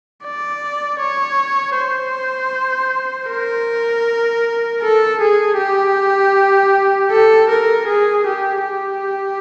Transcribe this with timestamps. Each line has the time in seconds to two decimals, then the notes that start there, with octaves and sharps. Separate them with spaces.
0.25 D5
1.01 C#5
1.77 C5
3.30 A#4
4.83 A4
5.21 G#4
5.58 G4
7.11 A4
7.50 A#4
7.88 G#4
8.27 G4
8.64 G4